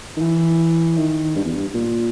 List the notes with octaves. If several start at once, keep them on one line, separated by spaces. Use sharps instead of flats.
D#3
E3
D#3
G2
E2
G2
A#2